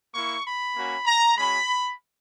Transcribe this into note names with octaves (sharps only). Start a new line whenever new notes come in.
A#3 E4 C#6
B5
A#3 C#4 F#4
A#5
G#3 C#4 F#4 B5